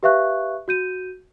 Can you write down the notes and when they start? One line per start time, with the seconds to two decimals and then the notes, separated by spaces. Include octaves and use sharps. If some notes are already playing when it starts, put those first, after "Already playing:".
0.03 G4 B4 E5 F5 C#6 F#6
0.68 F#4 G6 D#7